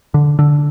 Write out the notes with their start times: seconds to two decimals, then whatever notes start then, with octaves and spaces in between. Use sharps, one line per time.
0.14 D3
0.39 D3